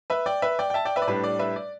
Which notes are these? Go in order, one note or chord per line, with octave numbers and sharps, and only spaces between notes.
B4 E5
D5 G5
B4 E5
D5 G5
G5
E5 A5
D5 G5
B4 E5
D5
A2 G3 D4 B4
D5
B4 E5
D5